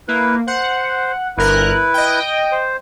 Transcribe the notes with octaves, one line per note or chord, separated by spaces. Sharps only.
A#3 E4 B4
C5 F#5
G1 E4 A#4 B4 F#6
D#5 G5
C5